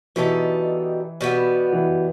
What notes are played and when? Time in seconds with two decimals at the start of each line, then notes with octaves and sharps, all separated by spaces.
0.16 B2 E3 G3 D#4 A4
1.21 B2 G3 B3
1.73 E3